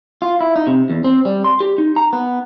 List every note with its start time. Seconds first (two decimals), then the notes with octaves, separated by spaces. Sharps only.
0.22 F4
0.41 E4
0.56 D#4
0.67 C3
0.90 E2
1.04 C4
1.25 G3
1.44 C6
1.60 G4
1.78 D#4
1.96 A#5
2.13 B3